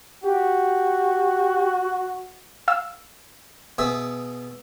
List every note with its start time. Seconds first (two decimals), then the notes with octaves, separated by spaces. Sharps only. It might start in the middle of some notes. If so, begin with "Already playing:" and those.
0.24 F#4 G4
2.68 F5 E6
3.78 B2 G#4 E5